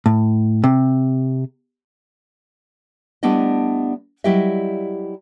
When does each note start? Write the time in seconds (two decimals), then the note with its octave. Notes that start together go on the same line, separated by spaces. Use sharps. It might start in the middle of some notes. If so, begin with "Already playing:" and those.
0.06 A2
0.64 C3
3.23 G3 A3 B3 D4 E4 D#5
4.24 F#3 G3 E4 G4 D#5 E5